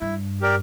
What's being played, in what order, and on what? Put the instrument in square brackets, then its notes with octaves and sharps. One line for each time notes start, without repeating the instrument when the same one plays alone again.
[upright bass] G2 [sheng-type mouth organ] E4
[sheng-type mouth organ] G4 A#4 D5